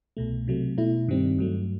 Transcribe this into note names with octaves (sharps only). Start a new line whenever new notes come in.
C2 B2 A3
C3 F#3 A3
B2 A3 E4
G2 D#3 G3 C4
G2 F#3 A3